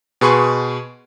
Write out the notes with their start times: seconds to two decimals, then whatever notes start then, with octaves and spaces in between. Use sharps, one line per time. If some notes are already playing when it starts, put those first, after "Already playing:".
0.21 B2 G#4 B4 C6 C#6